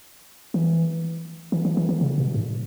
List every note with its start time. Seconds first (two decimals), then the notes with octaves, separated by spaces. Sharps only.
0.54 E3
1.52 E3
1.65 E3
1.77 E3
1.89 E3
2.01 C#3
2.18 B2
2.34 G#2